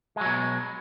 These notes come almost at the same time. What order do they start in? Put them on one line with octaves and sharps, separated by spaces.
G#3 F#3 B2